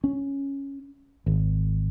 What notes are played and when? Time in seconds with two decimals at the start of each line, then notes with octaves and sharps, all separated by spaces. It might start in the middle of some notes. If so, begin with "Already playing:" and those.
0.04 C#4
1.26 G#1